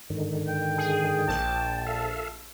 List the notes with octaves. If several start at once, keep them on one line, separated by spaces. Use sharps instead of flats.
G#2 D3 D#3
G5
G#4
A#1 A5
A4 E5 F5